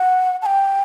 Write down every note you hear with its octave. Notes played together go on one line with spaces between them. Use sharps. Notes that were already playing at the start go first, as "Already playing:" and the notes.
Already playing: F#5
A5
G5